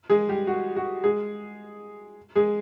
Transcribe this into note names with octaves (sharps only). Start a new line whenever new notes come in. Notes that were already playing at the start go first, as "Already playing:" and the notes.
G#3 G#4
G3 G4
F#4
F#4
G#3 G#4
G#3 G#4